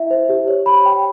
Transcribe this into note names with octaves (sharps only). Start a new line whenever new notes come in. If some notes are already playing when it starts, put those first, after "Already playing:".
Already playing: E4 E5
C5
G4
C#5
B5
G5